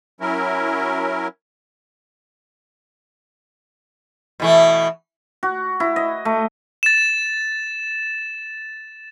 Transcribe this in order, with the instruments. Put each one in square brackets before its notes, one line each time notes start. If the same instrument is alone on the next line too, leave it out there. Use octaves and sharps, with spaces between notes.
[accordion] F#3 C#4 E4 A#4
[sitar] B2 E3 A3
[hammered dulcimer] F#4
E4
D#5
A3
[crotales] A6 E7